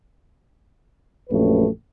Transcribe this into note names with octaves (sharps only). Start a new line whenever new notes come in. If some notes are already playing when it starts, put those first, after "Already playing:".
A#1 F#2 A3 C#4 G4 B4